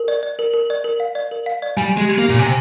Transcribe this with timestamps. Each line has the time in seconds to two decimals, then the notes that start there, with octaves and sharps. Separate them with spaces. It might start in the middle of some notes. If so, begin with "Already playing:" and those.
Already playing: A#4
0.08 D5
0.23 D5
0.39 A#4
0.54 A#4
0.70 D5
0.84 A#4
1.00 F5
1.15 D5
1.31 A#4
1.46 F5
1.62 D5
1.77 G3 G#5
1.92 G#3 G4
2.09 G4
2.18 A#3
2.24 G4
2.29 A#2
2.39 C3 G#5